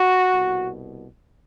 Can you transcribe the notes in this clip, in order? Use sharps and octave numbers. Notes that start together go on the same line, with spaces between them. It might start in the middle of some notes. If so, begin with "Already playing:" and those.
Already playing: F#4
C2 B2